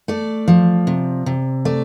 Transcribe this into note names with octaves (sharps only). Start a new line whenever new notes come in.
A3 D5
F3
C3
C3
A3 D5